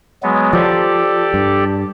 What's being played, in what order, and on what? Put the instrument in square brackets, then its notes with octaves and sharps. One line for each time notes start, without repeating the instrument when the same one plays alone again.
[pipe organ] F#3 G#3 B3
[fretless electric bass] F3 [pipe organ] G4 A4 D5
[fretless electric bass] G2